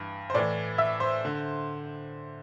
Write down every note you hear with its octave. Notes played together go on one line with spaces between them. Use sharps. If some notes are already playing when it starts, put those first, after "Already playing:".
Already playing: G2 E3
C5
A2 E3 D5
E5
C5
D3